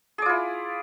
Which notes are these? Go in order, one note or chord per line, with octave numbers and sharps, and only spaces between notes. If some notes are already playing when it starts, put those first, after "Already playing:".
E4 F4 G#4 D5